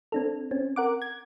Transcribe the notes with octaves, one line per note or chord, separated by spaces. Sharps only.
C4 D4 A4
C4 C#4
A#4 F#5 D6
G#6